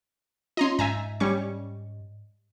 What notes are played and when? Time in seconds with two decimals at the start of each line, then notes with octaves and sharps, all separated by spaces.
0.57 C#4 F4 D#5 A#5 C6
0.79 G#2 E5 G#5 A#5
1.20 G3 C#4 C#6